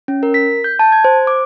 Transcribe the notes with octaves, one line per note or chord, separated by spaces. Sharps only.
C#4
A#4
B6
G6
A5
G#6
C5
D6